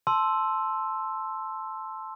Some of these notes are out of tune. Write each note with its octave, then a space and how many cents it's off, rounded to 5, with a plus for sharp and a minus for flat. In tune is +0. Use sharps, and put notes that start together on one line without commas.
A5 -5 C6 +0 E6 +0